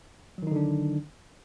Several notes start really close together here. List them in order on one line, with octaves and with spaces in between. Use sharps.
F#3 D#3 D#4 D3 D4